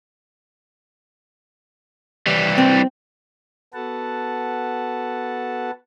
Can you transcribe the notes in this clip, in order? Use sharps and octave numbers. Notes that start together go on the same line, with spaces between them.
E3 G3
C4
B3 F#4 A4 B4 F#5 A5